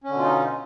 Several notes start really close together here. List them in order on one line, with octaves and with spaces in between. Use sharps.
C#4 D3 B2 F4 D#4